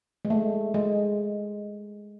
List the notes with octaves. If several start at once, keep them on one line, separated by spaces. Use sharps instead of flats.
G#3
A3
G#3